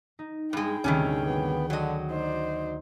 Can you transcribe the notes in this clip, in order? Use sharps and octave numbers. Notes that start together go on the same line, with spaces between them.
D#4
G2 G#3 G#4 G5
D2 G2 C3 D#3 C#4
B3
D3 F#3 D#5
D#4 C5 D5